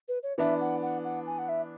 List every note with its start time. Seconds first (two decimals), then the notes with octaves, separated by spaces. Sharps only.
0.08 B4
0.23 C#5
0.38 E3 B3 D4 E5
0.61 F#5
0.82 F#5
1.04 F#5
1.26 G#5
1.38 F#5
1.49 E5